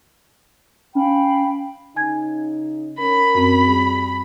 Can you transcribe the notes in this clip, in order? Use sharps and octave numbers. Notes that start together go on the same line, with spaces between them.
C#4 F5 G5 B5
C#3 D#4 G#5 G#6
C#4 A#4 B5
F#2 C4
G3 G#4